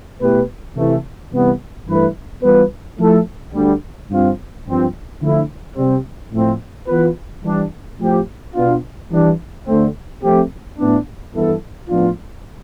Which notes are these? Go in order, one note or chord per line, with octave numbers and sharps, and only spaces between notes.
B2 A3 E4 G4 B4
C3 E3 A3
C2 C3 E3 G3 B3
G2 E3 A3 E4 B4
E3 G3 B3 F4 B4
F3 A3 E4 A4
D2 D3 G3
G2 F3 C4 F4
G2 F3 C4
D3 F3 A3 E4
C3 G3 C4
A2 F3 A3 C4
E3 B3 F4 B4
E3 G3 D4
A2 F3 C4 G4
B2 B3 D4 F4
E3 G3 D4
D2 D3 A3 C4
F3 A3 C4 G4
A2 E3 B3 D4
G2 E3 B3 E4 A4
A2 F3 B3 D4 F4